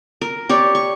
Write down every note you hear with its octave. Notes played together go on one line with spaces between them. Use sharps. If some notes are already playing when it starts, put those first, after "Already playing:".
A#4
G4 C#5 D5
C#6